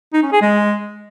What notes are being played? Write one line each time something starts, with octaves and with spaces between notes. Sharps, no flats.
D#4
C#4
G#4
G#3